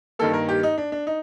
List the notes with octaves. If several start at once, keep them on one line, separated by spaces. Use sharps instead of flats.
G2 D#3 A#3 A4
A#4
G4
D#4
D4
D4
D#4